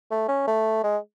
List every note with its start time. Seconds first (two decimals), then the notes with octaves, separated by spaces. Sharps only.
0.11 A3
0.28 C#4
0.47 A3
0.84 G#3